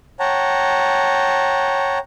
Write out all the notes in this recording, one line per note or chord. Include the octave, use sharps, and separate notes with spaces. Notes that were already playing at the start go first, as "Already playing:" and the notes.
C#5 F#5 G5 A5 A#5